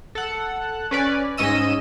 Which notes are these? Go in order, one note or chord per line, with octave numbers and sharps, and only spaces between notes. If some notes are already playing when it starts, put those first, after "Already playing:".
A4 F#5
C#4 B4 D5
G#2 C#4 D#5 E6 D#7